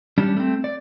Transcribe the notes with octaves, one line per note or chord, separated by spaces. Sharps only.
G3 C#4 D4 G4
A3 C4
D5